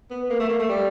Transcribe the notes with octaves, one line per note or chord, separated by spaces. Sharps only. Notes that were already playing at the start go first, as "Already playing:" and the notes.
B3
A#3
A3
A#3
A3
G3